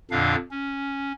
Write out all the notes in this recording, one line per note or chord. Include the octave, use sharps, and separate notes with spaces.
F2 A#2 D3 D4 F5
C#4